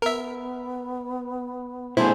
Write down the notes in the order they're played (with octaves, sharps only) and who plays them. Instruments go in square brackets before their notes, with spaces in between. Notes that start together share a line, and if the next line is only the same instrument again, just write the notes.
[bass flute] B3 [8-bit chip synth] A#4 E5
[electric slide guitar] B2 A3 G#4 [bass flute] D4 [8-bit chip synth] E4 [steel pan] C5